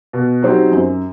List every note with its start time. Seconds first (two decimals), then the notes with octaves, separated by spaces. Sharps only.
0.13 B2
0.42 F#3 C4 D#4 G4
0.71 F#2